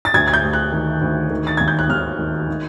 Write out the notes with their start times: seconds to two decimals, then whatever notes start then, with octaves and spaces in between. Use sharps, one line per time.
0.05 A6
0.14 D2 G#6
0.28 G#6
0.34 G6
0.44 D2
0.53 F#6
0.72 D#3
1.01 D2
1.30 D#3
1.47 A6
1.57 D#2 G#6
1.68 G6
1.79 F#6
1.89 D#2 F6
2.19 D#3
2.49 D#3